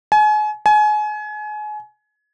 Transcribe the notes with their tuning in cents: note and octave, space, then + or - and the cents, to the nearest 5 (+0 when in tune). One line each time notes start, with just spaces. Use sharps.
G#5 +35
G#5 +30